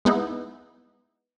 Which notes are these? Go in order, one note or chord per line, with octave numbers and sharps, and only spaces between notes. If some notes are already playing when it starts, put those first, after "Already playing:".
G#3 B3 D#4 E4